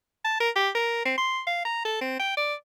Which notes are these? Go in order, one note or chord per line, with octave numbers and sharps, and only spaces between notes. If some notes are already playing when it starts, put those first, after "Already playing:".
A5
A#4
G4
A#4
C4
C6
F5
A#5
A4
C4
G5
D5